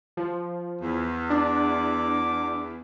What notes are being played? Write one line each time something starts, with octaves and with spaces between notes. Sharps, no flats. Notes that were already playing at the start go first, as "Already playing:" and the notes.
F3
E2
D4 D6